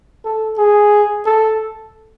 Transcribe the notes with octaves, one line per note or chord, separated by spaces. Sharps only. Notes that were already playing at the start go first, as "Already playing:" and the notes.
A4
G#4
A4